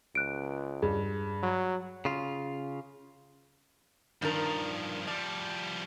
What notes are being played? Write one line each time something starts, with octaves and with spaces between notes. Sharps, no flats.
C#2 F#6 D7
G2 G#4
F#3
C#3 F4
G2 D#3 F3 D4 A#4
F3 G3 D5